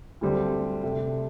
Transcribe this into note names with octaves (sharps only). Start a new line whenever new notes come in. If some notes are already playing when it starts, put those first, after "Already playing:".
D2 D3 G3 C4
C3 A3